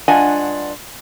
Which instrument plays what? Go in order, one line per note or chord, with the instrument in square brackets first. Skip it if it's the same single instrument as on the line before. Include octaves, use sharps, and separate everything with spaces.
[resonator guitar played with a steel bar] G2 D4 F4 D#5 F#5 G#5